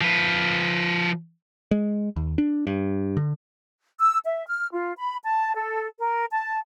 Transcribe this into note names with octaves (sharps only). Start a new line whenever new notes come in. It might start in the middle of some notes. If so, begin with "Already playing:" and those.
F3 B4
G#3
D#2
D4
G2
D3
E6
E5
F6
F4
B5
A5
A4
A#4
A5